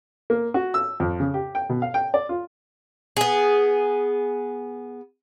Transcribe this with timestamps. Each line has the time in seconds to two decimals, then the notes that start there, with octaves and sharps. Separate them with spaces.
0.30 A#3
0.54 F#4
0.74 E6
1.00 F2
1.20 C#3
1.34 G4
1.55 G5
1.70 B2
1.82 F5
1.94 G5
2.14 D5
2.29 F4
3.17 B3 G#4